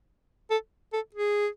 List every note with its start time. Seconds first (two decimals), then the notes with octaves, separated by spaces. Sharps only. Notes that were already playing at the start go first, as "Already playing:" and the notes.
0.51 A4
0.93 A4
1.15 G#4